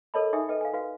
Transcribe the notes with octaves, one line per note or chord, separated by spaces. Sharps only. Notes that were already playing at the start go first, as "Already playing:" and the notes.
A4 A#4 C#5 D#5 A5 B5
D#4 G4 G#4 E5 G#5 D#6
A4 B4 D#5 G5
F5 G#5
F#4 B4 F5